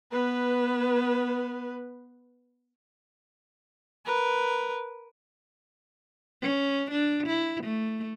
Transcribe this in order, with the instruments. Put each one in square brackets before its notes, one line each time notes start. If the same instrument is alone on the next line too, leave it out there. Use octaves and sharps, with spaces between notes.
[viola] B3 B4
[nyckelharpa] A#4 B4
[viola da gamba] C#4
D4
E4
A3